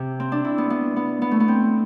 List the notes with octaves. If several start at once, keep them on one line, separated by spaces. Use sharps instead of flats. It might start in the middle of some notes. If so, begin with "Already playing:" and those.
Already playing: C3
C4
D4
E4
B3
B3
B3
B3
A3
B3
C4